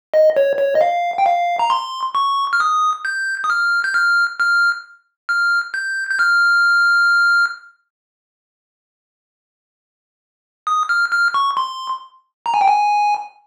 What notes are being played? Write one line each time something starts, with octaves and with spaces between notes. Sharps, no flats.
D#5
C#5
C#5
D#5
F5
G5
F5
A#5
C6
C#6
F6
D#6
G6
D#6
F6
G6
F6
F6
F6
G6
G6
F6
D#6
F6
F6
C#6
C6
A#5
G#5
G5
G#5